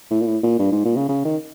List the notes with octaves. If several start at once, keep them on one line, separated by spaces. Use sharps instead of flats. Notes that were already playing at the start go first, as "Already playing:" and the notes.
A2
A#2
A2
A#2
G2
G#2
A#2
C#3
C#3
D#3